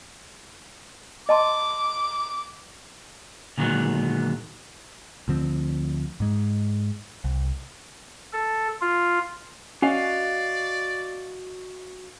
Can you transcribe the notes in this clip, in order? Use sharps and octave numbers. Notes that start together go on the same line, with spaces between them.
D#5 A5 C6 D6
A#2 D3 D#3 F#3 G#3 B3
D2 D3 F3 C4
G#2 G#3
C2
A4
F4
C#4 F#4 D5 D#5 F5